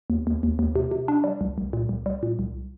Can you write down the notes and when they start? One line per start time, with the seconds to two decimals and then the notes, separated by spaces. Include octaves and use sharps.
0.10 D#2
0.27 D#2
0.43 D#2
0.59 D#2
0.76 C3
0.91 C3
1.08 D4
1.24 G3
1.41 C2
1.58 C2
1.73 A#2
1.89 C2
2.06 G3
2.23 A#2
2.39 C2